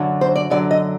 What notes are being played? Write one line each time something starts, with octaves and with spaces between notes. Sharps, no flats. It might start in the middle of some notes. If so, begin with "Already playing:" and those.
Already playing: F#2 D3 F#3
C5
D5
F#2 D3 F#3 D5
D#5